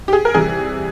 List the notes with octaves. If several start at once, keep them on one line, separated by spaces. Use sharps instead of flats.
G4
G#4
A#4
C3 E3 G3 G#4